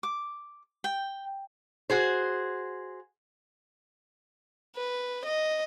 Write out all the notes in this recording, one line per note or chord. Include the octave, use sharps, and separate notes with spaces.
D6
G5
F#4 G#4 C5
B4
D#5